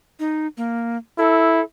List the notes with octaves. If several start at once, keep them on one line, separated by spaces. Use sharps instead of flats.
D#4
A#3
E4 A4